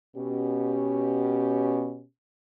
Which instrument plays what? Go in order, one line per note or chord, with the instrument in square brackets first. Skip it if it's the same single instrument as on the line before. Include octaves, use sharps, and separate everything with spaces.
[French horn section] B2 C#4 G4